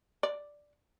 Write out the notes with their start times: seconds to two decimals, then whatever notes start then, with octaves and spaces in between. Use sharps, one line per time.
0.23 D5